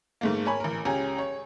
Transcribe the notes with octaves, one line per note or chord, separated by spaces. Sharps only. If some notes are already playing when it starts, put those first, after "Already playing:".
G#2 A3 A#3
A#4 C#5 G#5 B5
A1 A#4
C#2 C#4 G4 G#5 A#5
C#5